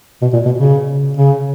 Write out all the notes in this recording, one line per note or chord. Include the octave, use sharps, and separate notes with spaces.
B2
A#2
B2
C#3
C#3